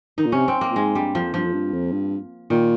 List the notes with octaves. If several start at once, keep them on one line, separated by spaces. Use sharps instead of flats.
D#3 D#4
A#2
C3 C#4
C4
A#3
A#2
G#2 G#3
G2 G3
F2 F3
G2 F3
F2
G2
F2
G2
A#2 D#3